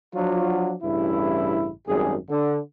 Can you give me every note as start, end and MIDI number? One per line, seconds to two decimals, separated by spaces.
0.15 0.74 53
0.15 0.74 54
0.15 0.74 62
0.15 0.74 65
0.15 0.74 66
0.83 1.70 33
0.83 1.70 43
0.83 1.70 49
0.83 1.70 64
1.88 2.15 32
1.88 2.15 42
1.88 2.15 55
1.88 2.15 68
2.30 2.58 50